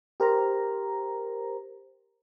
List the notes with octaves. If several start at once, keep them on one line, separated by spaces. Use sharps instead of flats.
G4 A#4 C5 A#5